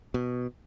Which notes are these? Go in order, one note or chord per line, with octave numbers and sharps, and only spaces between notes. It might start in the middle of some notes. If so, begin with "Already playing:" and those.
B2